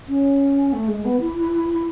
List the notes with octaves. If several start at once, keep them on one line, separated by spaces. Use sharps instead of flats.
C#4
A3
G#3
B3
E4
E4
E4
E4